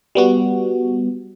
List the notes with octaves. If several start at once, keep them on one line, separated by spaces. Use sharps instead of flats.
G3 B3 F#4